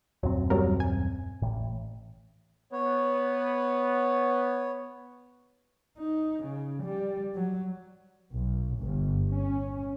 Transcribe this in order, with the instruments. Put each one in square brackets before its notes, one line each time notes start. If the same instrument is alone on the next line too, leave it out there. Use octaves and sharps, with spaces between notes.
[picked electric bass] D#1 F#2 C4 [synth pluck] F#3
[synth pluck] F#3 G3 A#4
G#5
[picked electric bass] A1 A2
[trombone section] B3 [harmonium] C#5
[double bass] D#4
C#3
G3
F#3
[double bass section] B1
G1
C#4